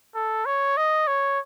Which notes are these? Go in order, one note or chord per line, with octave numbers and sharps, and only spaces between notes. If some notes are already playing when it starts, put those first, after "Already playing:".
A4
C#5
D#5
C#5